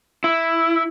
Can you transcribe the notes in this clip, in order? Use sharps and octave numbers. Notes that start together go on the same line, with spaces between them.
E4